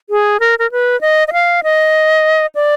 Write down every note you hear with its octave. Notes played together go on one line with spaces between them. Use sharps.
G#4
A#4
A#4
B4
D#5
D#5
F5
D#5
D5